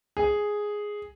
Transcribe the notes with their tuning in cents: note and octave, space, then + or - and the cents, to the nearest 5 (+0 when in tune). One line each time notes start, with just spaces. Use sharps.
G#4 +0